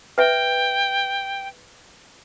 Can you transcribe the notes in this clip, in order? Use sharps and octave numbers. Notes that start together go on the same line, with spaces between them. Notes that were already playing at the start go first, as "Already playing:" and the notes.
B4 E5 G5